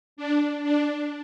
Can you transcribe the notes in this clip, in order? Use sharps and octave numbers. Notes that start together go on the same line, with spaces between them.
D4
D4